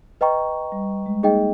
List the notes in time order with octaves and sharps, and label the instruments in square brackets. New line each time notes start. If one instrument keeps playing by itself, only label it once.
[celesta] B4 D#5 G5 A#5 C#6
[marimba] G3
G#3
[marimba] A#3 [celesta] D#4 G#4 D#5 G5